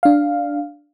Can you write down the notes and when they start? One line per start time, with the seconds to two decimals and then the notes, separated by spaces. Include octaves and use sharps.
0.03 D4 F5